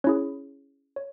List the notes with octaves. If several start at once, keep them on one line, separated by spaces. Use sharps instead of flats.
C#4 E4 G#4 C#5
C#5